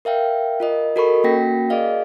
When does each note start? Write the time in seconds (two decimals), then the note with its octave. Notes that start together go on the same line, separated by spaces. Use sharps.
0.05 A#4 E5 F5 G5
0.60 F4 A#4 D#5
0.96 F#4 A4 A#4 D#5 B5 C#6
1.24 A#3 C#4 F#4 G5 A#6 B6
1.70 G#4 A#4 D5 D#5 F5